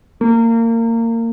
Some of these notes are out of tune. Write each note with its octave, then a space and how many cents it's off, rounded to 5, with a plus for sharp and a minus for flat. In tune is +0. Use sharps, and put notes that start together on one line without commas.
A#3 -25